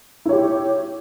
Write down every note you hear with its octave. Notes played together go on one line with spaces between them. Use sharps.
E4 G4 C#5